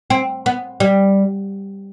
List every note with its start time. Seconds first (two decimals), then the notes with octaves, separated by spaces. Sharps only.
0.10 C4
0.46 B3
0.80 G3